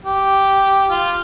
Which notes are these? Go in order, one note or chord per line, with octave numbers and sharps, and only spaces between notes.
G4
F4